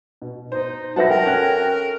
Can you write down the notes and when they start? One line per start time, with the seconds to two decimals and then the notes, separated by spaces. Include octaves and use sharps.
0.22 B2
0.52 D#4 C5
0.96 F#3 B4 E5 F#5 A5 A#6
1.08 A4 A#4 G5
1.26 C#4 F#6